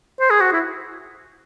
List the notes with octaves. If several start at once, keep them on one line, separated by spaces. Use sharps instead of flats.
C5
G#4
F#4
E4